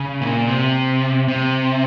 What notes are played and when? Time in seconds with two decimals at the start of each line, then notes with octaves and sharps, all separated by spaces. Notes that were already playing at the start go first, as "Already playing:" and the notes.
Already playing: C#3
0.21 A#2
0.47 C3
1.28 C3